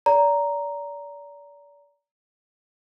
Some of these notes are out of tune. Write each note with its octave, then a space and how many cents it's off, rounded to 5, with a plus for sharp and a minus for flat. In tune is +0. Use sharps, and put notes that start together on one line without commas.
D5 -35 A#5 +0